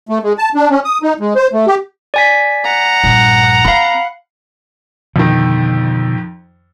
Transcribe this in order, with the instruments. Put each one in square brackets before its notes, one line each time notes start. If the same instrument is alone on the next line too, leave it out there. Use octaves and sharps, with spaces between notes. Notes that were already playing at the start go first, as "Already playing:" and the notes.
[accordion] A3
G#3
A5
D4
C#4
D#6
D#4
G#3
C5
A3
G4
[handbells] D5 G#5 B6
[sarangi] F#5 [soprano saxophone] A#5
[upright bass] A#1 G2
[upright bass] C4 [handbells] F5 B5
[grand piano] F2 D#3 [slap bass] B2 D3